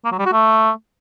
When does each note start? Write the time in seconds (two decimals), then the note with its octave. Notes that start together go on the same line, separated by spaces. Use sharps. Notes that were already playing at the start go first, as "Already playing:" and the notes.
0.05 A#3
0.12 F#3
0.19 G3
0.26 F#4
0.32 A3